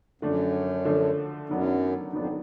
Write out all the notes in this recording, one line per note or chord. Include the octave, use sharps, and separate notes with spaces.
F#2 D3 F3 A3 D4
D3 F3 A3 D4
F#2 D#3 F#3 B3 D4
F2 D#3 F#3 B3 D4